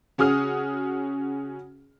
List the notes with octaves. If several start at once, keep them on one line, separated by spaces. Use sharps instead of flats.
C#3 C#4 F#4 G#4 D#6 F6